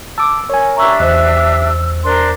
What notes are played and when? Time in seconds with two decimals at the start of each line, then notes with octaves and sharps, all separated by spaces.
0.18 A5 D6 E6
0.49 A#4 C#5 G#5
0.76 D4 G4 E5 A#5 C#6 E6
1.00 E2 C5 D#5 E6 F#6
2.04 D4 A#4 C5 C6